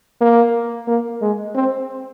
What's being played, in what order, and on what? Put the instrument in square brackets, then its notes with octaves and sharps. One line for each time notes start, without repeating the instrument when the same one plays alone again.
[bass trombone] A#3
A#3
G#3
C4